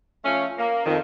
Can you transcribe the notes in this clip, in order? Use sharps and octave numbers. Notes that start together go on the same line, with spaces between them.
F3 A3 C#4
A#3
F2 D#3